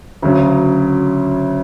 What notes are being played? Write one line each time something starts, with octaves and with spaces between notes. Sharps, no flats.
D2 C#3 F#3